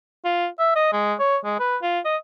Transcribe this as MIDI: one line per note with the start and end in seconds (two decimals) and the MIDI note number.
0.25 0.48 65
0.59 0.71 76
0.76 0.88 75
0.92 1.14 56
1.19 1.37 73
1.44 1.55 56
1.59 1.77 71
1.82 1.99 65
2.05 2.17 75